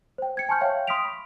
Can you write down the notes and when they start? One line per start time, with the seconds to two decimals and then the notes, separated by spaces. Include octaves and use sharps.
0.18 C5 G5
0.37 G#6 C#7
0.49 G#5 A5 C6 C#6 F6 G6
0.61 C#5 E5 F5 G5
0.87 C6 D#6 F6 B6 D7 F7
1.05 B5 C#6